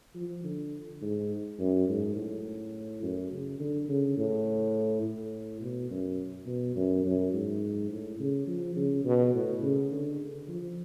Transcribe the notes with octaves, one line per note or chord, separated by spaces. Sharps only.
F3
D3
G#2
F#2
G#2
A2
F#2
C#3
D3
C#3
A2
A2
B2
F#2
B2
F#2
F#2
G#2
A2
C#3
F3
C#3
B2
A2
C#3
D3
F3